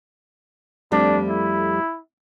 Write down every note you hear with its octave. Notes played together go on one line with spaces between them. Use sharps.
F2 G3 A3 D4
E4